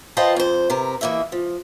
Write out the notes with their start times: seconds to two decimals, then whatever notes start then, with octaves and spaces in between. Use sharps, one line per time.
0.17 F4 B4 C5 D#5 G5 A5
0.36 F2 C5
0.70 C3 A#4 B4
1.01 E3 A3 A#3 D#5 E5
1.32 F3